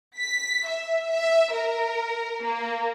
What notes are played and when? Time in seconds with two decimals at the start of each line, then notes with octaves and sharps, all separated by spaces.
0.18 B6
0.68 E5
1.10 E5
1.54 A#4
2.43 A#3